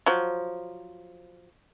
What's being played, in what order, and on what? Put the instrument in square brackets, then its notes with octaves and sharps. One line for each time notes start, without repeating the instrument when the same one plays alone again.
[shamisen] F3 F#3